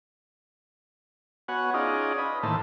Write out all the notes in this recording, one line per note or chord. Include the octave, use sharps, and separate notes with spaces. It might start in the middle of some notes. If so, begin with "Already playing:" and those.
B3 F#4 C#5 F#5 G#5
C#4 D#4 F4 G#4 D5 D#5
B4 D#5
A2 D#3 E3 A#3 C5 A5